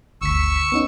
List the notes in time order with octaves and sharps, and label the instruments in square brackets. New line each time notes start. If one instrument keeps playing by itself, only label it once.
[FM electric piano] G1 D2 B6 [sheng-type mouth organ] C#6 E6
[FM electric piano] B3 C#4 D#4